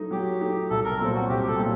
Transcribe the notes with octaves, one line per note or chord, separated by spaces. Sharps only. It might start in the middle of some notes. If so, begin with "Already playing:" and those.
Already playing: F#3 A3 D#4
F#3 G4
A3 D#4
C2 A4
A#4
A#2 F#3 C4 A4
F#4
C2 G4
A4
A#2 F#3